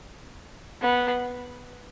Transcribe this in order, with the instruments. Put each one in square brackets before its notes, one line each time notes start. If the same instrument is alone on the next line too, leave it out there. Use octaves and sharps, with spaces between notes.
[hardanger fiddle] B3